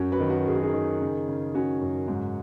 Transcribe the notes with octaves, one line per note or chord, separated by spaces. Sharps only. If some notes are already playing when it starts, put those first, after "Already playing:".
Already playing: F#2 C#4 F#4
F#4 B4
D#3
F#4 B4
F#2 G#4
F#4
D#4 G#4
D#3
C#3
C#3
C#3 C#4 F#4
F#2
G#2